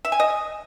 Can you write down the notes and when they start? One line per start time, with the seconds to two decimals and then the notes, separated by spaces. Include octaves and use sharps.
0.05 E5
0.12 G#5
0.20 D#5